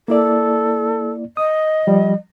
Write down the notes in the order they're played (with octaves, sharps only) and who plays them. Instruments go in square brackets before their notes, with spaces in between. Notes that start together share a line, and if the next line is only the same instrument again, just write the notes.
[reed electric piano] A#3 E4 D5 [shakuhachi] A4
[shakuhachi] D#5 [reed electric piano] D#6
[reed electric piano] F3 G3